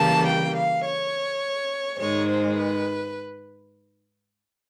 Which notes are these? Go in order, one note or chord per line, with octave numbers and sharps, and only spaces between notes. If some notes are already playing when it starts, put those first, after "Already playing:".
Already playing: C#3 E3 G3 A#3 A5
G5
F5
C#5
G#2 D#3 G#3 C#5
C5
B4